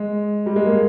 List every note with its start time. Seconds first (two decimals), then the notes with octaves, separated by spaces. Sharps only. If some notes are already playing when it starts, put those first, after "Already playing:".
Already playing: G#3
0.46 G3
0.56 G#3
0.65 A#3